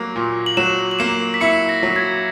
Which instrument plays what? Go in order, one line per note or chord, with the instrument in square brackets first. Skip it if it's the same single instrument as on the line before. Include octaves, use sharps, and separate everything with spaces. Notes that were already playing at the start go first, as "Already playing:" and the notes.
Already playing: [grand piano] F#3 A#3
A#2
[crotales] F#7
[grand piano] F#3 [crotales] E7
[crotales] F#7
[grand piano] A#3 [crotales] E7
[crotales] B6
[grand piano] E4 [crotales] C#7
[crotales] A#6
[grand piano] F#3
[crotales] G#6